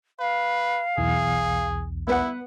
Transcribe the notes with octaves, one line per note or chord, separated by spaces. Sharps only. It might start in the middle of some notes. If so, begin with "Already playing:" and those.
B4 F5
B1 E2 G#4
B3 E4 B4 F#5